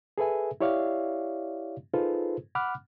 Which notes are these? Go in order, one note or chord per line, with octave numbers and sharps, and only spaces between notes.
G#4 A4 B4 E5 G#5
E4 G4 C#5 D5 E5 F5
D#4 F4 G#4 A4 B4 C5
F#5 B5 D6 F6 F#6